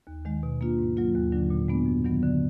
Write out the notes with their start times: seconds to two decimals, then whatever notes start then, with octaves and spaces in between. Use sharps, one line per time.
0.07 D#2
0.25 D#3 G#3
0.43 B2
0.61 A#3 D4 F4
0.79 G#2
0.97 F#3 A#3 F4
1.15 D#2
1.32 D3 F#3 D4
1.50 A#2
1.68 G#3 B3 D4
1.86 F#2
2.05 D#3 F#3 B3
2.23 D3